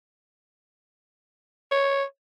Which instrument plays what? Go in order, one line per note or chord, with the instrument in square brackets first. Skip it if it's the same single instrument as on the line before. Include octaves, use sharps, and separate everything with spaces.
[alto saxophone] C#5